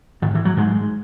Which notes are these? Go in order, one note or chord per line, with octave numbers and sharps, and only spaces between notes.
G#2 D#3
E3
F#3
G#2 G#3